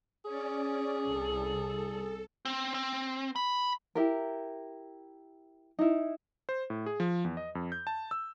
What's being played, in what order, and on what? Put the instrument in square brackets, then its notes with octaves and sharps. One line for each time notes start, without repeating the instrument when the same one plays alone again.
[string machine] C#4 D5 [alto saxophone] G#4
[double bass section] C2 [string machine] A4
[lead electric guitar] C4
C4
B5
[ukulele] E4 G4 A#4
D#4 E4
[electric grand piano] C5
A2
G#4
F3
E2
D#5
F2
G6
A5
E6